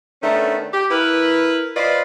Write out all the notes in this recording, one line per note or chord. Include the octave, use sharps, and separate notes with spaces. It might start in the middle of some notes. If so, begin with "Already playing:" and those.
D#3 A3 B3 C#4 D4
G4
E4 A#4 B4
F4 B4 C5 D5 D#5